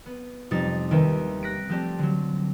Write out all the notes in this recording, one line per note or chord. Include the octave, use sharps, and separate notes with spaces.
B3
F2 C3 G3 D#4 A6
D#2 D#3 C4 B4 E5
F#6 A#6 B6 D7
F3 A3 C4 G4 A4 D5
D3 F#3